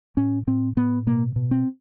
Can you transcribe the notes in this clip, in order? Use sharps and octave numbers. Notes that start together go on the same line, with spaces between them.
A2 C#4
A2 C4
A2 B3
B2 A#3
B2
C4